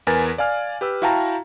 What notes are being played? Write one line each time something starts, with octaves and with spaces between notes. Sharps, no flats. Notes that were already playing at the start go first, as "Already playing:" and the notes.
E2 A#4 B4 G#5 A6
D5 F5 G#5 F6
G4 B4 E6
E4 F#4 F5 G5 A5 A#5